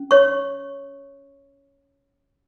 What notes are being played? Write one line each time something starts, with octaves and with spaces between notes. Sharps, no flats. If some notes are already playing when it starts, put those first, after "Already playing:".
Already playing: C#4
C#5 C#6